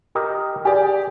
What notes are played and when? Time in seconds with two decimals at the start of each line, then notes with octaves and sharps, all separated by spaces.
0.15 G4 A#4 D#5
0.65 G4 G#4 D5